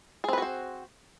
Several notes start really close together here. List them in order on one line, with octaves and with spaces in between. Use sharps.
G#4 C4 B4 F#4 C5